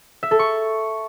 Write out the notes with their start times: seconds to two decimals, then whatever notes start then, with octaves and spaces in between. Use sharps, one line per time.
0.23 E5
0.31 A4
0.39 C#6